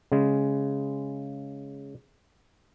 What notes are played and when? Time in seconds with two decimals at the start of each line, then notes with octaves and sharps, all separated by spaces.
0.12 C#3 G#3